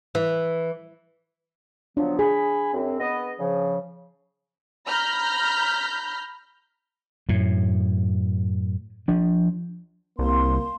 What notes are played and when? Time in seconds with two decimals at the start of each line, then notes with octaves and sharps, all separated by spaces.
0.15 E3
1.97 F3 F#3 B3 D4
2.19 G#4 G#5 B5
2.73 F#2 C4
2.99 B3 D#5
3.39 C#3 F3
4.87 A#5 B5 F6 G6 A#6
7.29 F#2 A2
9.08 F3 D4
10.19 C2 A#3 C6